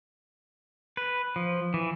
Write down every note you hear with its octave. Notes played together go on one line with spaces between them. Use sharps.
B4
F3
E3